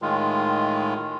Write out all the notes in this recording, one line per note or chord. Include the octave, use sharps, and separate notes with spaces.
A2 D#3 G#3 F4